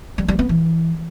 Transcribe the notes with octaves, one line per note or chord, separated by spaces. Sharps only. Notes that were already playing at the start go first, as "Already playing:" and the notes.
G3
G3
B3
E3